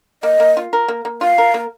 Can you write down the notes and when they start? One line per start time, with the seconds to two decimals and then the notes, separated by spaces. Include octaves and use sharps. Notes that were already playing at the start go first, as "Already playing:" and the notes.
0.23 A#3 D#5
0.40 A#3
0.57 F4
0.73 A#4
0.88 A#3
1.05 A#3
1.21 F4 F5
1.38 A#4
1.54 A#3